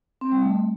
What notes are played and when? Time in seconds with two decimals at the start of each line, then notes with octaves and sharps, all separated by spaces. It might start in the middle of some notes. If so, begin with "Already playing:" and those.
0.21 C4
0.32 G3
0.42 A3